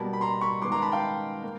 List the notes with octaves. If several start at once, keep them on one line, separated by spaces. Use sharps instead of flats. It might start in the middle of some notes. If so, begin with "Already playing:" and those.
Already playing: B2 G3 A#3 A5 B5
B5
A#5 C6
B5 C#6
D#3 G#3 B3 C6 D6
A#5 C6
A5 B5
F5 G5
A#3